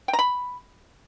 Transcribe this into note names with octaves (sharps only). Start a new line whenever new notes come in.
G5
A#5
B5